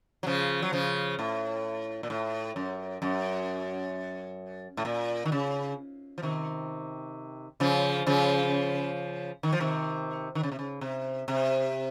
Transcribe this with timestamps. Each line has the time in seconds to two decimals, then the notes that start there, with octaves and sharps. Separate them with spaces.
0.23 F#3
0.27 C#3 F3
0.62 F#3
0.73 C#3 F3
1.19 A2
2.03 A#2
2.10 A2
2.56 F#2
3.02 F#2
4.77 A2
4.85 A#2
5.25 D#3
5.32 C#3
6.18 F3
6.23 C3 D#3
7.60 C#3 F3
8.07 C#3 F3
9.43 D#3
9.52 F3
9.61 C3 D#3
10.35 D#3
10.43 C#3
10.52 C3
10.59 C#3
10.81 C3
11.28 C3